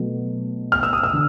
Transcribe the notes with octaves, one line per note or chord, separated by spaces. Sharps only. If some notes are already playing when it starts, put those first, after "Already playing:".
Already playing: B2 F#3 A3
F6
E6
D#6
E6
D3